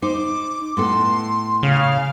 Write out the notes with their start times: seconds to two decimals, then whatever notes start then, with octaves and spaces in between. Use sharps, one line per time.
0.02 D#4 C5 D6
0.77 A2 B3 A4 C6
1.63 C#3 F5